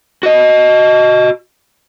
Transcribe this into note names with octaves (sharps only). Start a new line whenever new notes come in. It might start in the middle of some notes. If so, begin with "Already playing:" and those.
F#4 D#5